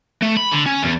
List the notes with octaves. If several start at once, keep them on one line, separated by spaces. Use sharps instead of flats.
A3
B5
D3
C#4
E2